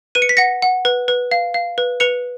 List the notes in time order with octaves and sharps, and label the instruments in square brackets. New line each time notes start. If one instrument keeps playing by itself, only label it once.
[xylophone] B4 D#7
C#7
B6
F#5 A#6 C#7
F#5
B4
B4
F5
F5
B4
B4 C#7 F7